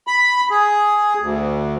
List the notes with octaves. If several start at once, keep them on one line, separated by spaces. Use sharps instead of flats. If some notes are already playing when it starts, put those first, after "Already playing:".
B5
G#4
D2